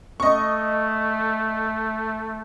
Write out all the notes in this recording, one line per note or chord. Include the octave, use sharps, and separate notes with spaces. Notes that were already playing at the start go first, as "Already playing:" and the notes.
A3 D#5 C#6